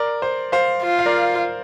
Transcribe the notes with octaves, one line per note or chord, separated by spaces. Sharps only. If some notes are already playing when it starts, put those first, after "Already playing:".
Already playing: A#4 D5
C5
C5 F5
F4
F5
A#4 D5